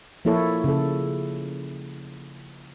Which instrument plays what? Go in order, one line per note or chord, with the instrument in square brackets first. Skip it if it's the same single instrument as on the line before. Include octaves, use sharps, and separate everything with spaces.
[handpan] F3 A#3 E4 A4 C#5
C#3 A4